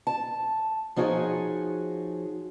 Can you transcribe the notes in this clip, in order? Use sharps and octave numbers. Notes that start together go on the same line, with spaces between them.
A5
F3 D#4 F#4 G#4 C#5